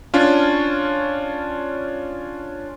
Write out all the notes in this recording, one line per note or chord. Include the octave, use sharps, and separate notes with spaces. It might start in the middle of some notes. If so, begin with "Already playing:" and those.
C#4 D4 F4